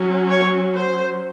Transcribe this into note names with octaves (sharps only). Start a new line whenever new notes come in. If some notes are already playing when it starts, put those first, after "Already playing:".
Already playing: F#3 C#4
C#5
C5